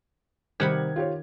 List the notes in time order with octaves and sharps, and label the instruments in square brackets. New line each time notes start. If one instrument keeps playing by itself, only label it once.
[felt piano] C3 G3 G#6 [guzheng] D#3 F#5 B5
[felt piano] F4 G4 C#5